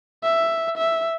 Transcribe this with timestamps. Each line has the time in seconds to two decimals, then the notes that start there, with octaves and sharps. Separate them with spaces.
0.24 E5
0.78 E5